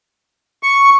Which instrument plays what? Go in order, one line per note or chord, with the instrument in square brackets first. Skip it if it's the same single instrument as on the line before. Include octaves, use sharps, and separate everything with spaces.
[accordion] C#6